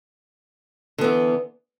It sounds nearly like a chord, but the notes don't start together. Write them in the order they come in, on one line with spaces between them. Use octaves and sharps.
D3 B3 E3